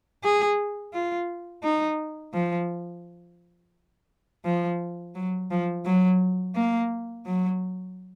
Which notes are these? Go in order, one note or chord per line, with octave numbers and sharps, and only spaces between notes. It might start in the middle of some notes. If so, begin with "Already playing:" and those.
G#4
F4
D#4
F3
F3
F#3
F3
F#3
A#3
F#3